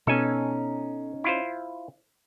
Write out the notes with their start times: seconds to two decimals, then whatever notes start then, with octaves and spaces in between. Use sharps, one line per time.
0.07 B2 B3 C#4 D#4 A4 G#5
1.24 E4 F4 C5